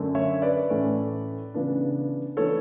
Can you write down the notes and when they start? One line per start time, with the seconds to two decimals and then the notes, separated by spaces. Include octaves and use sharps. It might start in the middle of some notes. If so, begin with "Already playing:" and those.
Already playing: F#2 D3 A3
0.15 C#5 E5
0.42 B4 D5
0.70 A2 E3 A3 C#4
1.54 C#3 E3 B3 D4
2.37 E3 B3 D4 A4 C#5